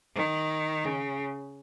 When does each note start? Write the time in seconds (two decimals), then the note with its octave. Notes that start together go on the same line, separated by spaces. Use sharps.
0.15 D#3
0.84 C#3